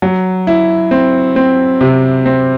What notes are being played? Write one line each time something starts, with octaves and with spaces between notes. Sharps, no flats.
F#3
E4
C4
C4
C3
C4